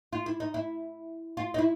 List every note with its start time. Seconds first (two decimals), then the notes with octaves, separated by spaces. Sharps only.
0.13 F4
0.26 E4
0.40 D#4
0.54 E4
1.37 F4
1.54 D#4
1.58 E4